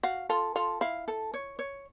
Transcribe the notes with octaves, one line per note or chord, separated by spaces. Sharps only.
F#4 F5
F4 A4
F4 A4
E4 F5
A4
C#5
C#5